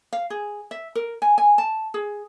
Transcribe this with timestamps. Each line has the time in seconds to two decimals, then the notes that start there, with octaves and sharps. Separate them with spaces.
0.13 F5
0.30 G#4
0.71 E5
0.95 A#4
1.22 G#5
1.38 G#5
1.58 A5
1.94 G#4